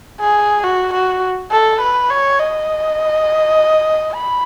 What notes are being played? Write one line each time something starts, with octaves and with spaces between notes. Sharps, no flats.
G#4
F#4
F#4
A4
B4
C#5
D#5
B5